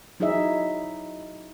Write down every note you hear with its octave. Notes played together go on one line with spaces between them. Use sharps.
F#3 D#4 E4 G#4 D#5 E5